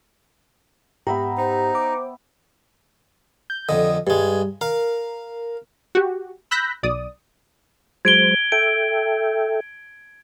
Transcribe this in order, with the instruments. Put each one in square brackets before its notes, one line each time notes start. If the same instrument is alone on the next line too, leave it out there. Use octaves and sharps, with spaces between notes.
[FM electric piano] G#2 G4 A#5 [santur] B3 E5 G5
[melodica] D#4 [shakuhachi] C5
[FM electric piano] D6
[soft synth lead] G6
[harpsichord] F2 D3 [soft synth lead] D#5
[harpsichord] G2 G#3 [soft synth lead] G3
[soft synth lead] A#4 [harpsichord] F5
[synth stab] F#4 G4
B5 E6 F#6 G6 A#6 B6
B1 D5 D#6
[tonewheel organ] F#3 G#3 C5 [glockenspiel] G#6 D7 G7
[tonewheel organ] A4 E5 G5 [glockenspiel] D7